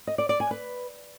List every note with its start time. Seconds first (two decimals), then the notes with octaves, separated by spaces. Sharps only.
0.07 D#5
0.18 D5
0.29 D5
0.40 G#5
0.51 B4